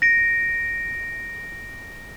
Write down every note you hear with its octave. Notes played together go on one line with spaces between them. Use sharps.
A#6 D7